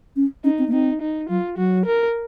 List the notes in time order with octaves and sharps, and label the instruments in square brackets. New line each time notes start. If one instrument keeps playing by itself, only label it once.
[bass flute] C#4
[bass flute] C#4 [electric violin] D#4
[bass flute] C4
A#3
[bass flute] C4 [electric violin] D#4
[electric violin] D#4
[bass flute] F#3 [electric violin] F4
[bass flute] F#3 [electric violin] F#4
[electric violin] A#4